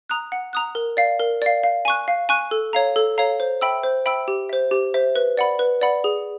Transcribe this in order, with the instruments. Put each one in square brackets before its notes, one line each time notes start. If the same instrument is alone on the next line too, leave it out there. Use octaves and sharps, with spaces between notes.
[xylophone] A#5 D#6 F#6
F#5
A#5 D#6 F#6
A#4
D5 F5
A#4
D5 F5
F5
G#5 C#6 F#6
F5
G#5 C#6 F#6
A4
C#5 F5 A#5
A4
C#5 F5 A#5
C5
E5 G5 B5 E6
C5
E5 G5 B5 E6
G4
C5 E5
G4
C5 E5
B4
D5 F#5 B5
B4
D5 F#5 B5
G#4